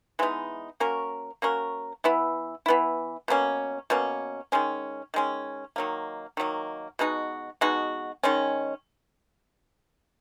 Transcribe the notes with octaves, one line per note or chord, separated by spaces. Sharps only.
E3 G#3 B3 D#4
A#3 C#4 F#4 A#4
A#3 C#4 F#4 A#4
E3 B3 E4
E3 B3 E4
B2 A#3 C#4
B2 A#3 C#4
D#3 G#3 C#4
D#3 G#3 C#4
D#3 F#3 A#3
D#3 F#3 A#3
B2 G#3 D#4 F#4
B2 G#3 D#4 F#4
D#3 G#3 C#4